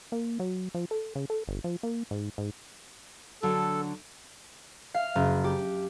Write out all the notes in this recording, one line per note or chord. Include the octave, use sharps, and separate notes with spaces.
A#3
F#3
F3
A4
C#3
A4
G1
F3
A#3
G#2
G#2
D3 F#3 D4 A4
F5
F#1
G4